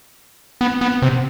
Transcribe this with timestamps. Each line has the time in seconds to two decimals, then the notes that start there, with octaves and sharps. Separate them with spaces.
0.61 B3
0.81 B3
1.02 C3